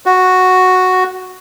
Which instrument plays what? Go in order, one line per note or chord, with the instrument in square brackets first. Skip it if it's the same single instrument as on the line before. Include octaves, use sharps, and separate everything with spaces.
[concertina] F#4